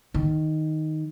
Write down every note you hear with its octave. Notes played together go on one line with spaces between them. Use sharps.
D#3